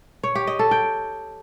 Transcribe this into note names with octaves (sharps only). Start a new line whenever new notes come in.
C#5
G4
D#5
A4
G5